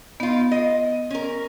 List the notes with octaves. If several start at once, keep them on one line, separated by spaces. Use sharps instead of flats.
B3 D#4 F4
D#5
C#4 A#4